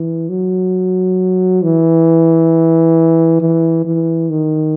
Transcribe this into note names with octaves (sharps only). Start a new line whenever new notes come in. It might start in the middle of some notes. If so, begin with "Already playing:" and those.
Already playing: E3
F#3
E3
E3
E3
D#3